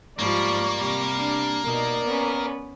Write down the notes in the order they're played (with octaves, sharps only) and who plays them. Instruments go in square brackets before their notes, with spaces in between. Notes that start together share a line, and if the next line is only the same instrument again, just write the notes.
[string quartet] G#2 F3 G3 [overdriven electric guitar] A#3 [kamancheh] D5 C#6
[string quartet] C3 G3
[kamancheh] D4
[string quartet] B2 D#4 [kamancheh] A#4 D5
[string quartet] B3 C#4 B4